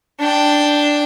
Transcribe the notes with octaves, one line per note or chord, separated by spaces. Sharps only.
D4 G5